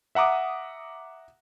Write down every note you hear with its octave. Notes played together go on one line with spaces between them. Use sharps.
E5 F#5 A#5 D6 D#6